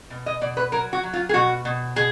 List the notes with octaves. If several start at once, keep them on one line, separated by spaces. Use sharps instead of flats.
B2
D#5
B2 D5
B4
F#3 A#4
F#4
F#3
F4
G#4
B2 F#4
B2
B2 G#4